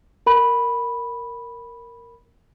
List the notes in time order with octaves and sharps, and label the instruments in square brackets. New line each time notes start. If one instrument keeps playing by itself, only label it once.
[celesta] A#4 B5